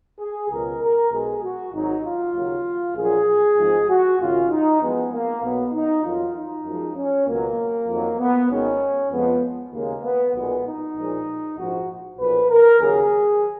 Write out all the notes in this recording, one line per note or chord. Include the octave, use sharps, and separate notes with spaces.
G#4
C#2 B2 F#3 A#4
A#4
B1 B2 G#3 G#4
F#4
G#1 G#2 F#3 D#4
F4
D#2 C#3 F#3
A#1 A#2 F#3 G#4
G#1 G#2 F3 G#3
F#4
G#1 F#2 C#3 G#3 F4
D#4
F#2 F3 G#3 B3
A#3
B1 B2 F#3 B3
D#4
F2 D#3 F#3 F4
D#4
F#2 F3 G#3
C#4
C#2 B2 F#3 A#3
F2 D#3 F#3
B3
G#1 G#2 D#3 G#3 C#4
F2 F3 G#3 B3
D#2 C#3 G#3 A#3
B3
B1 A#2 G#3 B3
D#4
A#1 A#2 F3 G#3
A#1 G#2 F3 G#3 F#4
B1 A#2 F3 B4
A#4
D#2 C#3 F#3 G#4